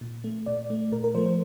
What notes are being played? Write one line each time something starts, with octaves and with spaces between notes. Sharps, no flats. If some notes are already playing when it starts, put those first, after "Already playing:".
A#2
A3
A#2 D5
A3
A#2 A#4
A#4
F3 A3 C5
C5